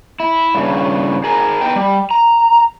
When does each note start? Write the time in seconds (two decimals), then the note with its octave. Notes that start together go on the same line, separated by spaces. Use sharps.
0.20 E4
0.55 G2 C#3
1.24 G#4 A#4
1.61 B3 D#4 G5
1.76 G3
2.11 A#5